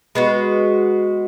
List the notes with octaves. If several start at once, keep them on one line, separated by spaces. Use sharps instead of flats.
G#3 B3 F#4